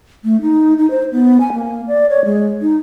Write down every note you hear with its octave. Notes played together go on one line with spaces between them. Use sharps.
A3
D#4
D#4
C5
B3
G#5
A#3
D5
C#5
G#3
D#4